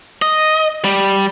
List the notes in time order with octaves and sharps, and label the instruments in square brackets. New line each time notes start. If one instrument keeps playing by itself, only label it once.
[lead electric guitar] D#5
G3